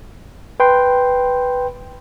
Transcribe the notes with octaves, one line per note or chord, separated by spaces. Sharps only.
B4 G5 C6